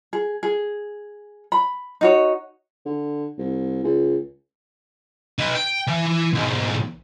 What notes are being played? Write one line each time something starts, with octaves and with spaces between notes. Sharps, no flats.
G#4
G#4
B5
D#4 F#4 C#5
D3
C2
C#2
D#4 B4
G5
E3
B1 G#2